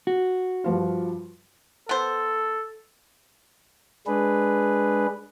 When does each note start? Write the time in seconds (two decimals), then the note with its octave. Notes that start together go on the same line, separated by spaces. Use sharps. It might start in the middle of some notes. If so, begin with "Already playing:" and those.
0.07 F#4
0.64 G2 F3 F4
1.89 B3 A4 C5
4.07 G#3 D4 G#4 B4